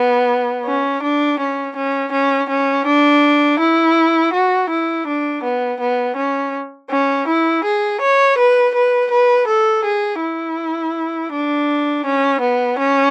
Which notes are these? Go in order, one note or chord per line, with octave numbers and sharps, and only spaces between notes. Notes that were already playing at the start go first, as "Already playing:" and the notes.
Already playing: B3
C#4
D4
C#4
C#4
C#4
C#4
D4
E4
F#4
E4
D4
B3
B3
C#4
C#4
E4
G#4
C#5
B4
B4
B4
A4
G#4
E4
D4
C#4
B3
C#4